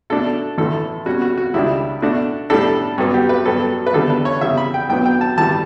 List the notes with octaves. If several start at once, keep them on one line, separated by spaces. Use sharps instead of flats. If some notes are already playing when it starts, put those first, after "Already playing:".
B2 A3 D4 A4
A1 A2 E3 A3 A4
B2 G3 C#4 F#4
F#4
F#4
C#2 C#3 G3 D4 E4
B2 A3 D4 F#4
A2 G3 D4 A4
G2 F#3 B3
G4
B4
G2 F#3 B3 A4
B4
E2 D3 G3 D4 A4
B4
C#5
E2 C#3 G3 E5
B5
G5
B1 A2 F#3 B3 D4 G5
G5
A5
A1 G2 E3 G3 A5